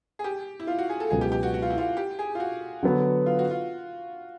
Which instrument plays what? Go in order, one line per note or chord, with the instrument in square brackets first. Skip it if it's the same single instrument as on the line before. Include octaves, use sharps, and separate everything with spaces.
[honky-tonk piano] G#4
G4
E4
F4
F#4
G#4
A4
[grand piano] C#2 B2 F#3 B3 [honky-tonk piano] G#4
[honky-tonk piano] G4
G4
F#4
F#4
F4
E4
F4
G4
G#4
F4
F#4
[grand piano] D3 F#3 B3
[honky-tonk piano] F4
F#4
F4